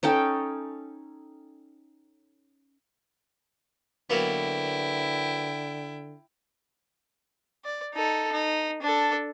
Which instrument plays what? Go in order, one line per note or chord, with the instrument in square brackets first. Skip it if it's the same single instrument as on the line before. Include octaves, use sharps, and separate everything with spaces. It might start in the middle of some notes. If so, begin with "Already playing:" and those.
[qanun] C#4 D#4 A4 G5
[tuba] D3 [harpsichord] F#3 A#3 B3 [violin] E4 G5
[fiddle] D5
D#4 A4
D#4
D4 A4